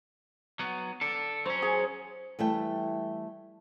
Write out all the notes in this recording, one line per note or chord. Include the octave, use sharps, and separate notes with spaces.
F#3 B3
D4 A4
F#3 C#4 C5
G#4
E3 G3 A3 E5 G5